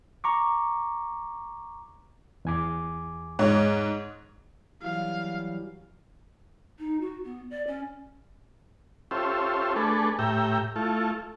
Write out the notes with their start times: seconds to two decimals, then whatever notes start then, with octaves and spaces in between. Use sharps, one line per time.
0.24 A#5 C#6 D6
2.45 E2 G#5 D6
3.39 G#2 C#5 D#5
4.83 E3 F#3 G3 F5
6.79 D#4
7.01 F#4
7.24 B3
7.50 D5
7.67 C#4
9.11 C#4 F4 G4 A4 C5 E5
9.76 A3 D4 G#4 A4 B4
10.19 A2 G4 E5 G5 A#5
10.76 A3 E4 F4 A4